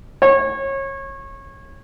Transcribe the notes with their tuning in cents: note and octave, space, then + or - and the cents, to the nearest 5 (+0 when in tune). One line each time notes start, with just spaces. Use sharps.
C#5 -25